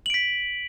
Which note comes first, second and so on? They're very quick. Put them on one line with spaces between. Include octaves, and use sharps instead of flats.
F#7 D7 B6